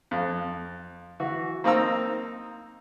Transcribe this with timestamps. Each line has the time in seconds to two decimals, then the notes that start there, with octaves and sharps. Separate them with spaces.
0.11 F2
1.20 E3 F#4
1.64 A#3 C4 D#4 A#5 E6